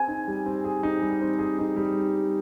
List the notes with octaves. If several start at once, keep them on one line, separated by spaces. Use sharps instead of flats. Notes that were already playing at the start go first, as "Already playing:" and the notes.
Already playing: C4 G#4 G#5
D#4
G3
C4
G#4
D#4
G3
C4
G#4
D#4
G3